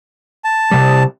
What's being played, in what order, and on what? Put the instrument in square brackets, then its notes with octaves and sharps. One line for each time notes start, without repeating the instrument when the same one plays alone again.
[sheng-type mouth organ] A5
[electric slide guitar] C3 G3